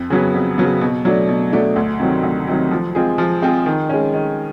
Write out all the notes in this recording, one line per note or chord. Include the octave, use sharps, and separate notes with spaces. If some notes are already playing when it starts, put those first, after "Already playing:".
Already playing: F2
C#3 F#3 B3
F2
C#3 F#3 B3
B2
F#3 A3 D4
B2
F#3 A3 D4
D2
C3 D#3 F#3
D2
C3 D#3 F#3
F3
G#3 C4 F4 G#4
F3
G#3 C4 F4 G#4
D#3
G#3 C#4
D#3